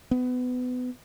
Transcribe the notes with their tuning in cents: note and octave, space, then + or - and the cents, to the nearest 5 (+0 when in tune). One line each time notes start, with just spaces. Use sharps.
B3 +25